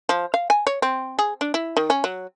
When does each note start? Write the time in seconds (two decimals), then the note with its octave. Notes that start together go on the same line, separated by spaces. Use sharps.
0.09 F3
0.34 F5
0.50 G#5
0.67 C#5
0.82 C4
1.19 G#4
1.41 D4
1.54 E4
1.77 D#3
1.90 C#4
2.04 F#3